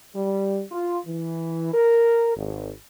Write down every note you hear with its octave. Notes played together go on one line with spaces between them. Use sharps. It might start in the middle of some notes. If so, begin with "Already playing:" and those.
G3
F4
E3
A#4
G#1